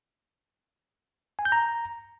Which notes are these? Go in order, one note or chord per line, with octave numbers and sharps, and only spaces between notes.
G#5
G6
A#5